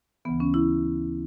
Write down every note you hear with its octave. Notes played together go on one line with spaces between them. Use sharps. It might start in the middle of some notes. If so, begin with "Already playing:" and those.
D2 C#3 E3 B3
C#4
E4